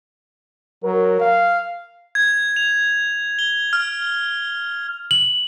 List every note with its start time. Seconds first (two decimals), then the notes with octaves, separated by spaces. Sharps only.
0.84 F#3 A#4
1.20 F5
2.15 G#6
2.56 F7
3.39 G7
3.73 F6
5.11 F#7